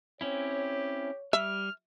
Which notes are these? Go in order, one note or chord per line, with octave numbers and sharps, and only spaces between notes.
C4 C#4 E4 G4 C#5
G3 E5 F6